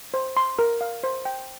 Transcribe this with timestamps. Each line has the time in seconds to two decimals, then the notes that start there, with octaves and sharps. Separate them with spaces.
0.14 C5
0.37 C6
0.59 A#4
0.81 F5
1.03 C5
1.25 G5